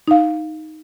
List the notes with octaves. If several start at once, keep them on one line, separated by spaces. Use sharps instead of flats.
D#4 F5